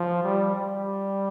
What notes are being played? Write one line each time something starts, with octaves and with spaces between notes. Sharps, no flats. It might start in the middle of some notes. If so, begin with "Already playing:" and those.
Already playing: F3
G3
G3